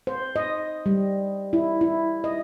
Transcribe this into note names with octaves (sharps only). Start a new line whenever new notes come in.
C5
D#5
G3
E4
E4
D#5